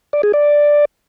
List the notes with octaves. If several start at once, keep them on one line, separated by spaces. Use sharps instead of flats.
D5
G#4
D5